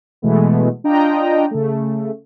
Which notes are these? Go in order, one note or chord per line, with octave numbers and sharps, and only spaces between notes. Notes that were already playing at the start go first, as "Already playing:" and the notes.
B2 E3 G#3 A3 B3
D4 F4 D#5 G5 A#5
C#3 A3